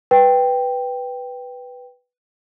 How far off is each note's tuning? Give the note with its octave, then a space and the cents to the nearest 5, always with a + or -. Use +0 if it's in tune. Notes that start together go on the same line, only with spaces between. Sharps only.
B4 +0 G5 +0